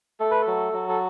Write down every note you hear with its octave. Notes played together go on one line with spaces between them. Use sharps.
A3 A4
B4
A4
F#3
F#3
A4